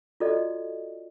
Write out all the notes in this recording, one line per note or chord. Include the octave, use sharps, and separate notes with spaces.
F4 F#4 A4 D5 D#5